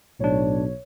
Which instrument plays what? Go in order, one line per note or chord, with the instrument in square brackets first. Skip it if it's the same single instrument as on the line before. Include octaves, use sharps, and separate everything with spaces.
[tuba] B1 [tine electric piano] A2 D4 [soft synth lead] C#5